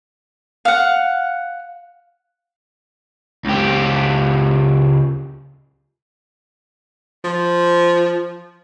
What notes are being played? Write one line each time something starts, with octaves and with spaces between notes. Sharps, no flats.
F5 F#5
C#2 G4
F3